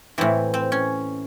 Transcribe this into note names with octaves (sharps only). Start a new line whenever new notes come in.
A2 E3 C4
C4
C#4